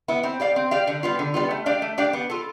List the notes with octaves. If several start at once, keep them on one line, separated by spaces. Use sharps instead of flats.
B3 E4
C4
G4 D5 F5
C4
G4 D5 F5
D3
G3 B3 F4
D3
G3 B3 F4
A3
D4 G4 D5 F5
A3
D4 G4 D5 F5
B3
F4 A4